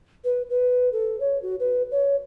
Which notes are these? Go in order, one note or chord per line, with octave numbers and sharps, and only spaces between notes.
B4
B4
A4
C#5
F#4
B4
C#5